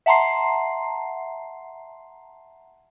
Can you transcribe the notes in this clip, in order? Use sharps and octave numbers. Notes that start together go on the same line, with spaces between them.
E5 F#5 A5 A#5 C6 C7